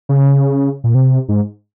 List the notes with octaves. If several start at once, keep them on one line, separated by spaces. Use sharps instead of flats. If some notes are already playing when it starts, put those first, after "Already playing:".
C#3
A#2
C3
G#2